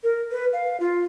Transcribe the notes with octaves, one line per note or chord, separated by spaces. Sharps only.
A#4
B4
F5
F4